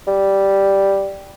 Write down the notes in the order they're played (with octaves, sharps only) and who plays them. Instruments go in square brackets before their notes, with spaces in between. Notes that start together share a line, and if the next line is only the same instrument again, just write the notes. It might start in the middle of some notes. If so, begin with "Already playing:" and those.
[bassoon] G3